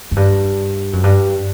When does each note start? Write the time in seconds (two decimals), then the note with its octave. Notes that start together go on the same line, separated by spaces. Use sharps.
0.11 F#2
0.16 G2
0.93 F#2
1.04 G2